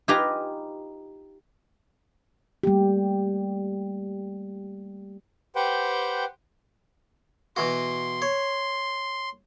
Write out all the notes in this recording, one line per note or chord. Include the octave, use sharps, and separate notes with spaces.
D#4 F4 G4 B4 G#5 A#5
G3 A3 A#3 G4
G4 B4 C5 F#5 G5
B2 E3 F#4 C6
C#5